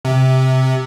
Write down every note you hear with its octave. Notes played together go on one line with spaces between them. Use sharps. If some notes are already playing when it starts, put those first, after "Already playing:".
C3